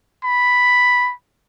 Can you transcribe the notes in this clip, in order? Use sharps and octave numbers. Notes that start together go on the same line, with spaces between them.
B5